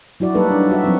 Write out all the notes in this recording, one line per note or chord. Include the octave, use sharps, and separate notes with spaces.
F#3 E4 F#4 D5
G3 A#3 D#4 A4 B4
D4
D#4 F#4 E5
F3 F#3 C4